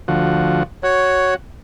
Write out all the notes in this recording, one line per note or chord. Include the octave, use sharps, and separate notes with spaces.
D2 F3 F#4
F#4 C#5